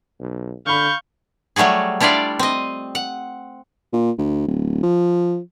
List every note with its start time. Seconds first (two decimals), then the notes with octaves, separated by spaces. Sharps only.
0.20 B1
0.67 D3 F5 B5 C#6 F6 G6
1.56 F#3 G3 A3 F#4 G#4
2.00 G3 D4 E4 F4 D5
2.39 C4 D#5
2.95 F#5
3.93 A#2
4.18 D2
4.48 D1
4.83 F3